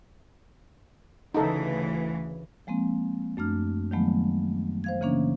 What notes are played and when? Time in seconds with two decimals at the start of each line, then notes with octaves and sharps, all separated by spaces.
1.34 D2 C#3 E3 D#4 A4
2.67 F3 G#3 A#3 C4
3.37 F#2 A3 D4 F6
3.91 D#3 F3 F#3 G#3 A3 B3
4.84 C5 F5 G#6
5.01 C#3 E3 A#3 C#4 D4